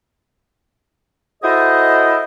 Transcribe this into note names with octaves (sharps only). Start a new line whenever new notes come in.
E4 F#4 G#4 A4 C5 D#5